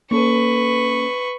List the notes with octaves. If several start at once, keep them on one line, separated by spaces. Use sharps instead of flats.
A#3 C#4 A4 B4 C#6